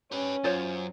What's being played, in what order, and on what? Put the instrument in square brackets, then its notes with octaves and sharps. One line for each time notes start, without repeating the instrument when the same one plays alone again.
[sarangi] C#4 [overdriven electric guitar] G4 B4
[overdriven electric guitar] F#2 [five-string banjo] F4 C5 C#5